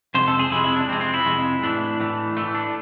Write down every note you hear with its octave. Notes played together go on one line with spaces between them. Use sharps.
F2 C3 G#3 C5
A4
G#4
F2 C3 G#3 E4
E4
D4
F2 C3 G#3 C4
C4
E4
F2 C3 G#3
A2 E3 A3 D4
A2 E3 A3
A2 E3 A3
D4